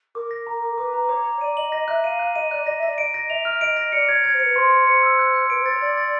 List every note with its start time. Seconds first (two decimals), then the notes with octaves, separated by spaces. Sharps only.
0.15 A#4 D6
0.31 A#6
0.47 A#5
0.63 D6
0.78 B4 D6
0.93 A#5
1.09 C#5 D6
1.25 D6
1.41 D5 D#7
1.57 D#5 F#7
1.72 D#5 A#6
1.88 E5 F#6
2.04 F5 D#7
2.19 F#6
2.35 D#5 D#7
2.51 D5 F#6
2.62 D5
2.67 D#5 A#6
2.77 E5
2.83 D5 A#6
2.98 D#5 D7
3.14 A#6
3.30 E5 F7
3.45 F6
3.61 D#5 D7
3.77 A#6
3.92 D5 C#7
4.08 C#5 G#6
4.24 C#5 G#6
4.34 C5
4.40 B4 C#7
4.55 C5 C6
4.71 C#7
4.87 C5 C#7
5.03 E6
5.19 F#6
5.34 F#6
5.50 B4 D7
5.60 C5
5.66 A6
5.71 C#5
5.81 D5 A6
5.97 A6